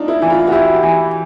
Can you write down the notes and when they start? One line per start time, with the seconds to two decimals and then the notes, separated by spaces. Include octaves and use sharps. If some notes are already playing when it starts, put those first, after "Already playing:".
Already playing: D4 D#4 F4
0.08 E4
0.22 E3 E4
0.30 F4
0.47 F#4
0.52 E4 G4
0.83 E3